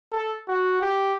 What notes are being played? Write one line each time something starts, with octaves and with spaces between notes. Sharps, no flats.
A4
F#4
G4